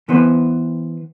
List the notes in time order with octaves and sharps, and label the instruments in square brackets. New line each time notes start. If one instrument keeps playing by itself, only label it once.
[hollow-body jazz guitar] E3 B3 B4 C5